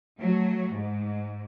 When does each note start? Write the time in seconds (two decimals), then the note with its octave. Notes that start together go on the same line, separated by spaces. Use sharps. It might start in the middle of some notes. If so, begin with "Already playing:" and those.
0.18 F#3 A3
0.71 G#2